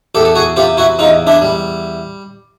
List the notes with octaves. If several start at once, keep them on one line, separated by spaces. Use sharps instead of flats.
E2 G4 A4
A4
F#4 G#4
C3 F4 G4
E4 F#4
E2 D#4 F4
D4 E4
G3